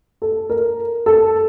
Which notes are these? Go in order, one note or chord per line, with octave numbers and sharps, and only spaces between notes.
A4
A#4
A4